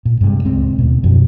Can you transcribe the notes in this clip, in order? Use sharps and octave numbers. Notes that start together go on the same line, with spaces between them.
A#2
G2 C3 G#3
D1 C#2 G#3 C4
D#2 B2
F#2 B2 F3